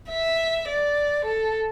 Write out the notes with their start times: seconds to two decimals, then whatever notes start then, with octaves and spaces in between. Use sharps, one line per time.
0.10 E5
0.68 D5
1.25 A4